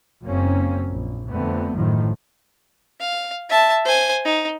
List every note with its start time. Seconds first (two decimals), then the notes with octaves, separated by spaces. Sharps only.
0.23 F#1 F#2 A#3 C4 C#4
0.88 A#1
1.31 F2 D3 A3 B3 C4
1.75 A1 F#2 A2 D#3 F3
3.00 F5
3.49 E5 A5
3.85 C5 G#5
4.25 D#4